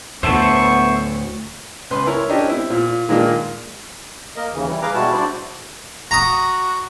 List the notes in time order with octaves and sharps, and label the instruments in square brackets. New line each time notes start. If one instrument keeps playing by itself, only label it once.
[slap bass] D2 A2 [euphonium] B3 [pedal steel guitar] C5 E5 A5 [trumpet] C#6
[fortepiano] C#2 B4 C6
E4 A#4 C#5
C#4 D4 G4 A#4 D#5
C4 E4
A#2
A#2 D#3 G#3 A#3 D4
[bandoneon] A#3 A#4 D#5
D#2 C#3 E3
E3 G3 E4
G#4 B4 F5 A#5 D6
B2 G3 G#3 E4 F#4 A5
D4 E4 F#4 C5 D5
[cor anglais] F#4 [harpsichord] A#5 D#6